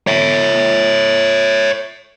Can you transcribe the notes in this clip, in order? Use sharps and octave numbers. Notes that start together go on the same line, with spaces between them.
C#5 E5